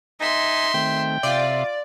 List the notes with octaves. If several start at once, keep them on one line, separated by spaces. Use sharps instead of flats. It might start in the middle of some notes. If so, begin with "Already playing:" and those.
D#4 E5 G#5 C6
D#3 A3 C4 G5
C3 F4 D5 E5 C6